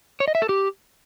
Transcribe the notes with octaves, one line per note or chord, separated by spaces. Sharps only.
C#5
D#5
E5
A4
G4